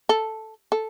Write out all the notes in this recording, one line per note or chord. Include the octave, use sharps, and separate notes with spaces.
A4
A4